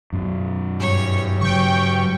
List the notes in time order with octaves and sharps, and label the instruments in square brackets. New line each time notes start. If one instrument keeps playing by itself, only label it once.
[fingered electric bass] F#2 B2
[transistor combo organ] G2 [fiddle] C#5
[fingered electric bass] C#3 F#3 [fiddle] C#5 [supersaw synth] G5 C#6